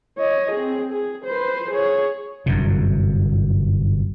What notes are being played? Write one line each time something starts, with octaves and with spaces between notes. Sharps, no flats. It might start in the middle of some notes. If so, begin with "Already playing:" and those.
C#5 D#5
C4 G#4
G#4
B4 C5
G#4 C#5
G1 F#2 C3